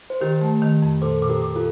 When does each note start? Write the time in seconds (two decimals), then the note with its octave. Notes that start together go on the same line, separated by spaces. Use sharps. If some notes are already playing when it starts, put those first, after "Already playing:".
0.10 C5
0.21 D#3 G4 A#4
0.41 A3
0.62 D#3
0.82 F2
1.02 A#2 A4 C5
1.23 A#2
1.29 G4 A#4
1.42 A#2
1.56 F4 A4